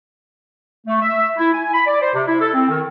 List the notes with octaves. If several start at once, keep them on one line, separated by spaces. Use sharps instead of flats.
A3
E5
E4
G#5
B5
D5
C5
C3
E4
A4
C4
D#3